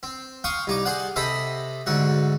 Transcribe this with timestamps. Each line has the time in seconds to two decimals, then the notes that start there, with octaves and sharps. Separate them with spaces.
0.03 C4
0.44 F5 G5 C6 C#6 D#6
0.67 C2 D#4 D6
0.85 G#4 C5 D5 F#5
1.16 C3 A4 C5 D#5 B5 D#6
1.86 D2 G#2 C4 F#4